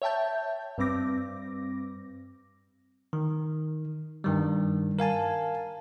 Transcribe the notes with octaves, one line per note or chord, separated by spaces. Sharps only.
C#5 E5 G5 A5 G6
G2 G3 C4 D6 A#6
D#3
G2 D#3 G3
A#4 F5 G#5 A5